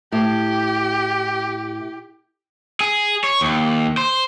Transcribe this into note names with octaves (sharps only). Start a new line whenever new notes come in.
A2 G4
G#4
C#5
D#2
C5